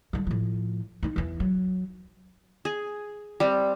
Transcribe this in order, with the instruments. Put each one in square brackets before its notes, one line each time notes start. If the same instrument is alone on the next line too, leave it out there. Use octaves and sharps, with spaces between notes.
[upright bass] D3 G3
A2 F3
C4 D#4
E2 E3
F#3
[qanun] G#4
G3 C4